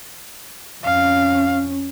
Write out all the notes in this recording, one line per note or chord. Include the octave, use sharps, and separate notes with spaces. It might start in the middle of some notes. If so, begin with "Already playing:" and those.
F2 C#4 F5